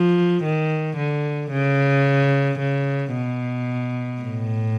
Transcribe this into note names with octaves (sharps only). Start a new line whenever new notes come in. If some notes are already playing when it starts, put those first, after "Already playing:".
Already playing: F3
D#3
D3
C#3
C#3
B2
A2